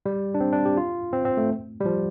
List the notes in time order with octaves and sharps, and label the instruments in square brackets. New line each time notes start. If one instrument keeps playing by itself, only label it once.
[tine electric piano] G3
D4
C4
D4
G4
F4
C4
C4
A3
G3
F3